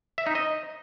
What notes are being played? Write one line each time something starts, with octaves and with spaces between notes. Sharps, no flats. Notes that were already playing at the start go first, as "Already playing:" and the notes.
E5
D#4
D#5